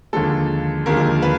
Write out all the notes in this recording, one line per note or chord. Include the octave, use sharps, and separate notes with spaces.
D#2 D3 F3 G#3 A4
D#2 D3 F3 G#3 A#4
B4